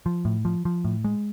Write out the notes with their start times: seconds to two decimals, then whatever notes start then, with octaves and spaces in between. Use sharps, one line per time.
0.06 F3
0.25 A2
0.45 F3
0.65 F3
0.85 A2
1.05 G#3